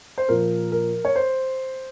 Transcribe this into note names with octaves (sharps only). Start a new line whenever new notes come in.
C5
A#2 F3 A#4
A#4
C#5
C5